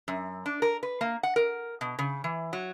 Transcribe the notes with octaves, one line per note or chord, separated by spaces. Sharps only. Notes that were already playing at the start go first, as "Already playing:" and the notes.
F#2
D4
A#4
B4
A#3
F#5
A#4
B2
C#3
E3
F#3